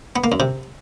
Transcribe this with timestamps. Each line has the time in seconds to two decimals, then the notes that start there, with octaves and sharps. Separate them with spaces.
0.16 B3
0.24 A#3
0.32 F#2
0.40 C3